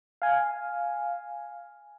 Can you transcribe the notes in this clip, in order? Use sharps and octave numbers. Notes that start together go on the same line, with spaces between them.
F5 G#5